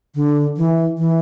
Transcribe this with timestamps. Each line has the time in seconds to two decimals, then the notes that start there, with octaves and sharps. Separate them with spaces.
0.15 D3
0.57 E3
0.98 E3